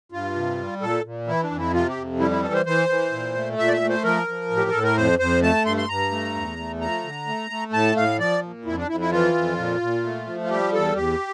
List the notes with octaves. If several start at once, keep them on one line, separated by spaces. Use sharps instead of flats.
G2 F4
C3
G3
A#2 A4
A#2
E3 E4
D4
F2
E4
C3 F4
G4
F2
G3 E4
E4
E3 A4
C5
E3 C5
E3
A#2
A3
A#2 E5
D5
E5
A3
C5
F3 A#4
F3
A2
G4
A2 A4
A#4
F2 C5
F2 C5
A3 A5
G2 C6
C6
G2 A#5
A3
E2
A3
F3 A#5
D3
A3
A3
A2 A5
A2 F5
F3 D5
A#2
F2 E4
D4
F2 E4
E4
E3 F4
F2
A#2
A#2
A3
F3
F4
G3 G4
E2 A4
E2 G4